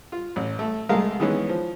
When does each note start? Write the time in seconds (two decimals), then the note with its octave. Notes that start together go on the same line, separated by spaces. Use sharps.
0.12 F4
0.36 A1
0.59 A3
0.89 C2 G#3 A3 A#4 F5
1.20 D#3 E3 G#3 B3 C#4
1.49 F3